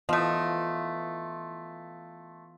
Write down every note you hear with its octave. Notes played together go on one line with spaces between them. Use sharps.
E3 F3 A3 B3 F4 D#5